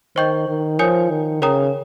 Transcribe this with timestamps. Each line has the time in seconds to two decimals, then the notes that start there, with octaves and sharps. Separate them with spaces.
0.16 D#3 C5 D#5 G5 C#6 G6
0.48 D#3
0.79 F3 A#4 C#5 G#5 D#6 G6
1.10 D#3
1.41 C#3 A#4 C#5 G5 A#5 D#6